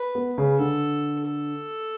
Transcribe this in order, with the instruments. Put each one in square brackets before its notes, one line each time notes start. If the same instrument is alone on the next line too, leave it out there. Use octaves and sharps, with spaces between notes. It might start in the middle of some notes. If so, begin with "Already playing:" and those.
Already playing: [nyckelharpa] B4
[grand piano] B3
C#3
[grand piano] D3 [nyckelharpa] A4
[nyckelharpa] A4